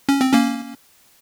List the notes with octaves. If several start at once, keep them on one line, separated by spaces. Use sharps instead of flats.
C#4
C4
A#3 C#4